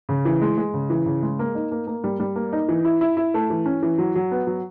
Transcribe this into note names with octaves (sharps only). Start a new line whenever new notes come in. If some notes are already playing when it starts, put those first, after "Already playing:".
C#3
E3
G#3
G#3
C#3
E3
C#3
G#3
A#3
D#4
A#3
A#3
G3
G3
A#3
D#4
E3
E4
E4
E4
A3
E3
C#4
E3
F#3
F#3
B3
F#3